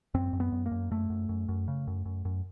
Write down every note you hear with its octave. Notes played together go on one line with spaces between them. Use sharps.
F#2 C4
F#2
B3
F#2
A#3
F#2
F#2 A3
F#2
F#2
F#2
C#3
F#2
F#2
F#2